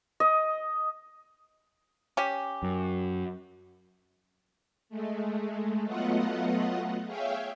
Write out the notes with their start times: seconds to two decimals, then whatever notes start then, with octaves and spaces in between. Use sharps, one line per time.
0.20 D#5
2.17 C#4 G4
2.63 F#2
4.89 G#3 A3
5.84 F#3 A3 B3 F4 D#5 F#5
7.06 G#4 C#5 E5 F5 G5